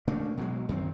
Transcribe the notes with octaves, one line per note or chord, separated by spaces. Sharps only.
C#3 A3 A#3 D4
B2 F#3 G#3
F#2 D#3 C4